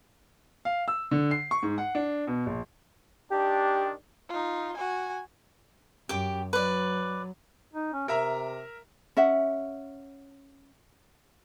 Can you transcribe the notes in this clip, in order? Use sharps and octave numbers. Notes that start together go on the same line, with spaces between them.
F5
E6
D3
C7
C#6
G#2
F#5
D4
B2
A#1
D#3 D4 G4
D#4 F4
F#4 G#5
F#2 G4 D6
F#3 B4 D5
D#4
C#4
C3 A#4 E5 A#5
C#4 E5 F#5